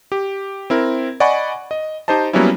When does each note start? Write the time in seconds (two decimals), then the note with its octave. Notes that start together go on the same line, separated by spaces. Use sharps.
0.12 G4
0.70 C4 E4 A#4
1.20 D5 D#5 F#5 G#5 B5 C#6
1.71 D#5
2.08 D#4 G4 C5 D#5 A5
2.33 F#3 G3 A#3 B3 C#4 E4